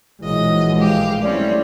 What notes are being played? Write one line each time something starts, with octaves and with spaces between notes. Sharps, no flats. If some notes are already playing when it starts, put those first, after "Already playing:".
A#1 E3 F#3 G#3 D#5
G4 F5
G3 A3 C4 C#4 E4 D5